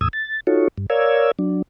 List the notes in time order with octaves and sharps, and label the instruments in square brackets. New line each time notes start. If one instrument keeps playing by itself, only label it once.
[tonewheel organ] E2 A2 D#6 E6 G#6
A6
D#4 F4 F#4 A4 C#5
G2
A#4 C#5 D5 F5 E6 G#6
F#3 D4